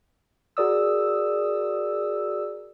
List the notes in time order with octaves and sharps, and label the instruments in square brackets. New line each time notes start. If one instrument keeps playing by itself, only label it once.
[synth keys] F#4 G#4 A#4 D5 D#6 E6